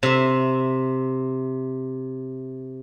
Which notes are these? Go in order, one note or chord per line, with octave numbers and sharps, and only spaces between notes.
C3 E5